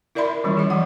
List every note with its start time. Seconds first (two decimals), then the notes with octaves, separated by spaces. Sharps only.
0.15 E4 A#4 D5 E5 B5 C6
0.44 D#3 E3 G3 C#4
0.57 G#4 D#5
0.70 F3 F#3 F#5